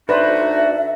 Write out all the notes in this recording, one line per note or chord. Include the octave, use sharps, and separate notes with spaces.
D2 D4 D#4 F#4 B4 C5 E5